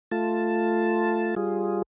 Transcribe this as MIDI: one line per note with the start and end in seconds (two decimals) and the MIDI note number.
0.11 1.35 57
0.11 1.35 65
0.11 1.35 81
1.36 1.82 55
1.36 1.82 65
1.36 1.82 68